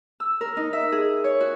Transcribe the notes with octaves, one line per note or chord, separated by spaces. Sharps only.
E6
A#4
D#4
E5
G#4
C#5
F#4